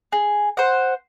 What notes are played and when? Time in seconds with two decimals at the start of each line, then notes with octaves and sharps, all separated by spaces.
0.12 G#4
0.57 C5 F#5